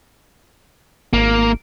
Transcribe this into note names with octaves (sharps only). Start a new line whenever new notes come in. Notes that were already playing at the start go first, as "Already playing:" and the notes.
G#1 A#3